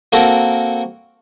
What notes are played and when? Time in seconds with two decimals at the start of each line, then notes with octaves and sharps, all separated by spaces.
0.13 A#3 C4 F#4 A4 A#4